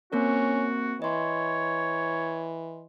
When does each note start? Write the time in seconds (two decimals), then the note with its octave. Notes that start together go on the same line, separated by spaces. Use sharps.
0.13 A#3 C4 C#4 F#4 A#4
1.02 E3 C#5 D#5 C6